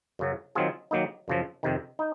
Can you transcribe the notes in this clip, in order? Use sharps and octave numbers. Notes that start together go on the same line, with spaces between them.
F#2 C#3 F#3
D#3 F#3 C4 F4 G#4
D#3 F#3 A#3 D#4
F#2 C#3 F3
F2 C3 D#3
D#4